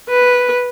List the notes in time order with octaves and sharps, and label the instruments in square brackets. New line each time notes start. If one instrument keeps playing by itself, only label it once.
[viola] B4